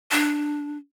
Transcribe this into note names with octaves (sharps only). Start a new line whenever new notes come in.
D4